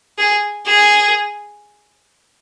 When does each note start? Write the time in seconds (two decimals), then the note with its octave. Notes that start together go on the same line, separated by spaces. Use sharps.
0.18 G#4
0.67 G#4